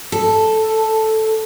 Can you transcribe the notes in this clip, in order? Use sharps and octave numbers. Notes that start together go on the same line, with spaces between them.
A4